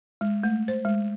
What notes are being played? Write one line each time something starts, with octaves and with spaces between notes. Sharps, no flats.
G#3
A3
C5
G#3